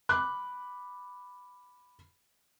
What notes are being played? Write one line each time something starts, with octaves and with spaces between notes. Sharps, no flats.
B5 D6 F#6